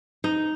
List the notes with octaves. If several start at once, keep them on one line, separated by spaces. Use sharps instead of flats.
D#4